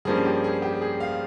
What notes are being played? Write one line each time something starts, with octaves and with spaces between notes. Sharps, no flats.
G2 F3 A#3 C#4 G#4
G4
G#4
G4
G#4
F5